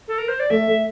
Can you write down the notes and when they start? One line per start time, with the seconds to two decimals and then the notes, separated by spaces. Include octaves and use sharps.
0.08 A4
0.18 A#4
0.28 C5
0.40 D5
0.50 A3 E5
0.67 A3